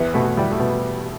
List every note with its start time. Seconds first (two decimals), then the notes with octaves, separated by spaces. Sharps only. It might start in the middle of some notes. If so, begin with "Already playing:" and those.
Already playing: E2 B3
0.14 B2 A3
0.37 E2 G3
0.52 A3
0.60 B2